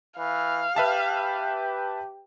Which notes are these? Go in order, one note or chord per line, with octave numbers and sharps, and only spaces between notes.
E3 F5
G4 B4 E5 A5